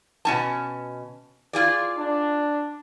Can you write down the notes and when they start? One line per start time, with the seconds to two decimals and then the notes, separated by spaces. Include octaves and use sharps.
0.25 B2 C#4 A5
1.53 F4 G#4 D5
1.98 D4